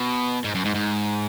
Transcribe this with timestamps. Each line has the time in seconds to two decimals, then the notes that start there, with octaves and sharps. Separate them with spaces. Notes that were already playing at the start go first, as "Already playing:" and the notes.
Already playing: B2
0.44 G#2
0.55 F#2
0.65 G#2
0.75 G#2